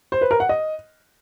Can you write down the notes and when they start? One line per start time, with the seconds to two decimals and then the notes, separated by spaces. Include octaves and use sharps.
0.12 C5
0.21 B4
0.31 A#4
0.40 F#5
0.49 D#5